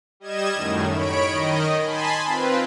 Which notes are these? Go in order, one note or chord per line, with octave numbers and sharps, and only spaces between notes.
G3 D#5 G#6 E7
F#2 A2 D#3
C#5 B5 D7
D#3 D#5
G#5 A5 B5 C6
C4 F4 B4